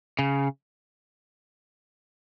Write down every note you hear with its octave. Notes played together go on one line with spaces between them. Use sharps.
C#3